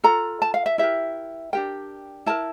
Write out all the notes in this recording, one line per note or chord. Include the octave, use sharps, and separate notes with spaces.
F4 A4 A#5
A5
F5
E5
E4 G4 A#4 E5
D4 G4 A#4 G5
E4 A#4 A5